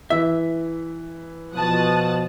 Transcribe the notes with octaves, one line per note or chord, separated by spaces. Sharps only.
E3 E5 B6
B2 F3 A5 D#6 F#6